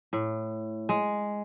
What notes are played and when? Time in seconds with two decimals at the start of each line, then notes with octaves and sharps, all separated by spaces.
0.13 A2
0.89 G#3